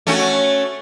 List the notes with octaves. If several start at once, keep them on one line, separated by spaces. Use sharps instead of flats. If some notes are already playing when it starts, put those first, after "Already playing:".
A3 C#4 F#4